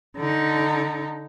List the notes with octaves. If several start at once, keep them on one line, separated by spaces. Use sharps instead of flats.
D3 D#4